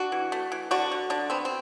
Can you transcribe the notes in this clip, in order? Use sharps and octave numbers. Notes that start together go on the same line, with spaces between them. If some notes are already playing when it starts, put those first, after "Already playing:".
Already playing: D4 F#4
E3
A3
E3
D3 D4 F#4
D3
D3 D4
B3 C4
C4